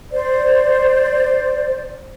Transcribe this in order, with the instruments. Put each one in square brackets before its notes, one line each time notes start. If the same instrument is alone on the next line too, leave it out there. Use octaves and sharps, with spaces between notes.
[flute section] C5 D5